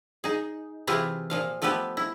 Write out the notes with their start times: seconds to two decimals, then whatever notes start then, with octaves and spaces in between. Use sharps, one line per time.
0.24 D#4 G#4
0.87 C3 E3 E4 F4 G4 G#4
1.30 A#2 F3 F5
1.62 F3 A3 B3 G4 B4
1.97 E4